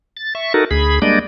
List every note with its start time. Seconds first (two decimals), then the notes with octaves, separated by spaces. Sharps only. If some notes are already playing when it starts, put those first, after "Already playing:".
0.17 A6
0.35 E5 C#6
0.54 D#4 F#4 A4 A#4
0.71 D2 G#4 B5
1.02 G3 G#3 A#3 D4 D5 D#5